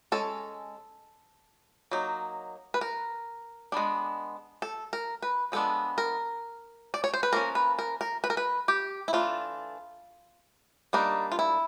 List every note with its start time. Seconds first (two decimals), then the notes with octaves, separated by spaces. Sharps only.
0.12 G#3 C#4 A4
1.91 F#3 A#3 D#4
2.74 B4
2.81 A#4
3.72 G#3 B3 D4
4.62 A4
4.93 A#4
5.22 B4
5.52 F3 G#3 B3 D4 A4
5.98 A#4
6.94 D5
7.04 C#5
7.14 C5
7.23 B4
7.33 F3 A#3 C#4 A#4
7.55 B4
7.79 A#4
8.01 A#4
8.24 B4
8.30 A#4
8.37 B4
8.68 G4
9.08 E4
9.13 E3 A3 D4 F4
10.93 G3 A#3 D4 D#4
11.32 F4
11.39 E4